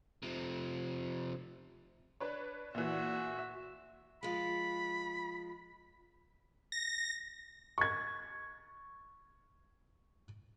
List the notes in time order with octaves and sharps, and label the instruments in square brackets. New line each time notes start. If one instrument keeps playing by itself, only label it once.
[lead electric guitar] C3 F3
[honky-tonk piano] D4 B4 C#5
[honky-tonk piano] A#2 E3 [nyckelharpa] F#4 E5
[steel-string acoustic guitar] F3 G#3 [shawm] B5
[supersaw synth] A#6
[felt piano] C#6 G#6